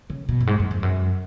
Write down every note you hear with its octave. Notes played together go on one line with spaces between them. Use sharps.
C#3
B2
F#2
G#2
F#2
F2
F#2